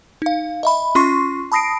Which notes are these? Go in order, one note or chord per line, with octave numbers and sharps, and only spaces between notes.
D#4 F5
D#5 E5 B5
C#4 F4 C6 C#6 C7
A5 B5 D#6 A#6 C7 D7